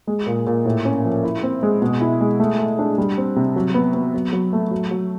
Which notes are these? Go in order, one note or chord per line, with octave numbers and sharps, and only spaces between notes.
G#3
A#2
A#2
A2
C#4
F3
E4
C4
G#3
B2
E4
G#3
A3
A3
D4
G3
C4
C3
F#3
B3
B3
F#3
F#3
A3
F#3
F#3